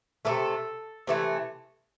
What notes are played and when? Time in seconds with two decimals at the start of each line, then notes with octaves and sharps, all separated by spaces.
0.25 C3 E3 A3 A4
1.07 C3 E3 A3